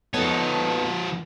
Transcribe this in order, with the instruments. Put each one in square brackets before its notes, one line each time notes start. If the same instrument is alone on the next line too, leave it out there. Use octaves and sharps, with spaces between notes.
[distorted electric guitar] F3 C#5 [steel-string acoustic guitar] B3 D#4 A4